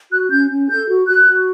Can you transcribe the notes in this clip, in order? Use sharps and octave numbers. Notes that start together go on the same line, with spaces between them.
F#4 F#6
C#4 G6
C#4
A4 G6
F#4
F#4 F#6
F#4